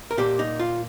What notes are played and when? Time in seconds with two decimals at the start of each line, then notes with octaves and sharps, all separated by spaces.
0.11 A#4
0.17 A#2 A#3 G4
0.39 D#4
0.59 F4